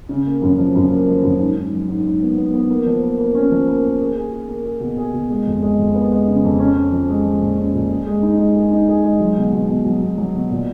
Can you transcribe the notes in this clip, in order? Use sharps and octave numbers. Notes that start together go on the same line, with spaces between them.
C#3
A#3
F#2
F3
F#2
A#3
F3
F#2
G#2
G#2
F#3
G#2
G#2
B3
B3
B3
A#3
F3
A#3
A#3
C#4
F3
A#3
A#3
G#4
G#4
G#4
A#3
G#4
B2
G#4
B2
G#3
F2
G#3
F2
B3
G#3
C#3
F2
C#4
C#4
F3
G#3
F3
A#2
C#4
A#2
G#4
G#3
D#4
G#3
G#4
D#4
G#4
G#3
F#3
B2
B2
B2
F#3
B2
F#3
B2
A#2